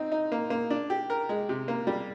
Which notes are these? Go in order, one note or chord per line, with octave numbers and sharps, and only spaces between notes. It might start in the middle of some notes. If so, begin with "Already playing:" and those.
Already playing: C4 D#4
D#4
A#3
A#3
D4
G4
A#4
G#3
C3
A#3
G3